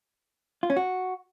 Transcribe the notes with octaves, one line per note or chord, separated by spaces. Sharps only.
F4
C#4
F#4